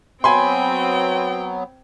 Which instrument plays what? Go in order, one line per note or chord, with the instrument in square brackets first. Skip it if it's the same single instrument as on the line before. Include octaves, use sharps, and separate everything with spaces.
[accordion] F#3 B3 [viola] C4 G5 [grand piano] G#5 B5 C6